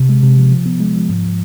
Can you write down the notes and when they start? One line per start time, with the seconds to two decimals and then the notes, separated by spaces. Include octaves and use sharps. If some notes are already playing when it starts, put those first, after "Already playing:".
Already playing: C3
0.09 G#3
0.23 C3
0.38 F3
0.51 F3
0.66 B3
0.80 G#3
0.95 F3
1.09 G#2